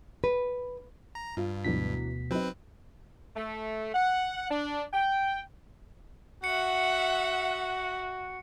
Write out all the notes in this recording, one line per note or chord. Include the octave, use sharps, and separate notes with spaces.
B4
A#5
G2 F4
D2 B2 E3 F#3 D4 B6
F#3 C4 D#4 B4
A3
F#5
D4
G5
F#4 E5 F#5 C#7